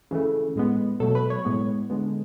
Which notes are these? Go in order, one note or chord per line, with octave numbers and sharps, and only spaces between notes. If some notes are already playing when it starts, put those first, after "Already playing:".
C#3 E3 A3
A2 G#3 B3
B2 F#3 A3 A4
B4
C#5
A2 G#3 B3
D3 G#3 B3